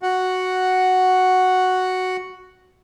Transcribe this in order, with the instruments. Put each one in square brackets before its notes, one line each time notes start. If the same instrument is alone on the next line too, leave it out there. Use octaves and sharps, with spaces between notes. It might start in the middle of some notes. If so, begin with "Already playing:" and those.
[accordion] F#4 F#5